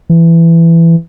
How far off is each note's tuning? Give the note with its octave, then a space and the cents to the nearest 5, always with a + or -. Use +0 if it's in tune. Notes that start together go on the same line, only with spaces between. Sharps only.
E3 +15